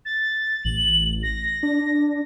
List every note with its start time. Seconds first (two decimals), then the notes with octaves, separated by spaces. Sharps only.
0.05 A6
0.65 A1 F#7
1.23 A#6
1.63 D4